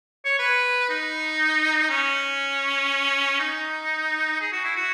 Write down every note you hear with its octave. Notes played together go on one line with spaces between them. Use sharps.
C#5
B4
D#4
C#4
D#4
G#4
F#4
E4
F#4